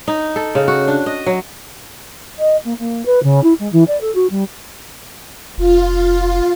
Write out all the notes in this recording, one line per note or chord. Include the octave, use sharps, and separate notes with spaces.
D#4
A4
C#3
F#4
D4
D#5
F#3
D#5
A#3
A#3
B4
C#3
E4
G#3
E3
D5
A4
F#4
G3
F1 F4